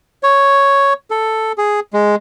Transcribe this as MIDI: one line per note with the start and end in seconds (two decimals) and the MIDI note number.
0.23 0.93 73
1.11 1.52 69
1.58 1.80 68
1.93 2.15 56